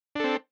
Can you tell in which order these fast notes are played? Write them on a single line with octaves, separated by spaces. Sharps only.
D4 A4 C4